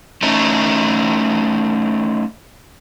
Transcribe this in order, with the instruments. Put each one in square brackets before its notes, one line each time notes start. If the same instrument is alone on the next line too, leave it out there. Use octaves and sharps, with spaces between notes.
[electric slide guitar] A3 C#4 D#4 E4